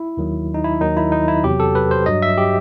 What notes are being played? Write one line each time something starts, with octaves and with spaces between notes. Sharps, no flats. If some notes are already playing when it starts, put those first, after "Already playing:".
Already playing: E4
D#2 D#3 F#3
D#4
E4
D#2 D#3 F#3 D#4
E4
D#4
E4
E2 C3 F#3 G4
A4
B4
C5
G2 F#3 D#5
E5
G4